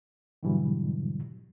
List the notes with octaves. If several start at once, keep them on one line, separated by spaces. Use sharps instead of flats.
G#2 B2 D3 E3 F#3 G3